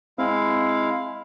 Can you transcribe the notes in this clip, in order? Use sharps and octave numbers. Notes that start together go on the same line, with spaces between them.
G#3 C4 E4 F5